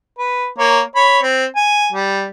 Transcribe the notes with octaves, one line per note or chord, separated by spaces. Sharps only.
B4
A#3 C#5
C#5 B5
C4
G#5
G3